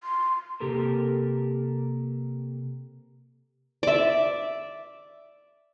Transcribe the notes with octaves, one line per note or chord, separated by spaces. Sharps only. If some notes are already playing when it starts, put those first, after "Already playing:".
C6
C3 A#3 G4 A4 A#4
D5 E5